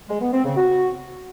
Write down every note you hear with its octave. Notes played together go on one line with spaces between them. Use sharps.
G#3
B3
C4
C#3
F#4